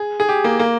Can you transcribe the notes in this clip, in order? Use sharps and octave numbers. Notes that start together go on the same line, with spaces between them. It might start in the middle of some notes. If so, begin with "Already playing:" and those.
Already playing: G#4
G#4
G4
A#3
A#3